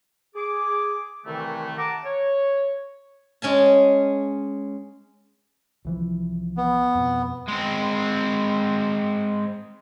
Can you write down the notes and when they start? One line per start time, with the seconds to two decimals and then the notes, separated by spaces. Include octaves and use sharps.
0.35 G#4 D6
1.25 C2 C3 D#3 E3 A3
1.77 F#5 A5 A#5 D6
2.04 C#5
3.42 G#3 C#4 G#5 A5
5.85 C2 E3 F3
6.57 B3
6.95 F2 B2
7.48 G#3 C4